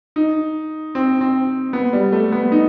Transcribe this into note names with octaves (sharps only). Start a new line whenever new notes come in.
D#4
C4
C4
B3
G3
A3
B3
D#4